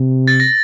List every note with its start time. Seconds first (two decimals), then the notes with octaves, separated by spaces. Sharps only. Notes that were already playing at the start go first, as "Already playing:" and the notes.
Already playing: C3
0.28 A6
0.40 A#6